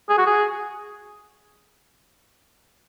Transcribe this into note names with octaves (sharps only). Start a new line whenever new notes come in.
G#4
F#4
G#4